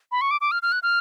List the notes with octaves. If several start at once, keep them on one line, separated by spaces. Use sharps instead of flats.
B5
C#6
D6
D6
F6
F6
F#6
F6